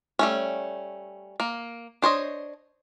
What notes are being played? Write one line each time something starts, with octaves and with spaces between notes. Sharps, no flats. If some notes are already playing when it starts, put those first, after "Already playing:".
G3 A3 C#4
A#3
D4 C5 C#5 D#5